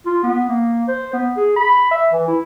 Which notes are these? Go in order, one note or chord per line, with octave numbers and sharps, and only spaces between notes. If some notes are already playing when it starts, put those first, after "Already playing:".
F4
B3
A#3
C5
B3
G#4
B5
E5
E3
E4